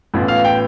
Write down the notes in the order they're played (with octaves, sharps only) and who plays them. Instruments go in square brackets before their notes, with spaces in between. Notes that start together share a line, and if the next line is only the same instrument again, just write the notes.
[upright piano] A1 A2 E3 B3 F4
[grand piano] F5
G5